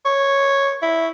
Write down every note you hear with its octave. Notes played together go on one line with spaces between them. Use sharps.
C#5
E4